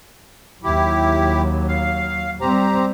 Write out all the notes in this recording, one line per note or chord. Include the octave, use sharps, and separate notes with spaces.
D#2 F#3 E4 G4
F5
G3 C4 G4 C5 A#5